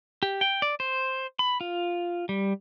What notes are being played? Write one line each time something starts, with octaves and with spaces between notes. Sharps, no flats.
G4
G5
D5
C5
B5
F4
G3